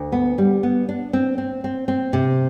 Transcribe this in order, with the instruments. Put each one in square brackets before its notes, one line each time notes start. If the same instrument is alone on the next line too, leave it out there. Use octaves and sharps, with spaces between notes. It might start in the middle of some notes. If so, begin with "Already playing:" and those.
Already playing: [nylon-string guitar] D2
B3
G3
B3
D4
C4
C4
C4
C4
C3